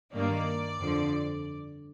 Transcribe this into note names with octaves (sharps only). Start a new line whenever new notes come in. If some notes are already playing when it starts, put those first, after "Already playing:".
G2 D#3 A#3 D5
F2 D3 F3